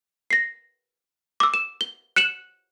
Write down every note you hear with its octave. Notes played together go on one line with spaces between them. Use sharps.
A#6 C7
D6 E6
E7
G7
F#6 C#7 E7 F#7